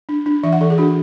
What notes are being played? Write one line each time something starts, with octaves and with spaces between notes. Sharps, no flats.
D4
D4
E3 E5
F#5
E3 A4
G#4
D4 F#4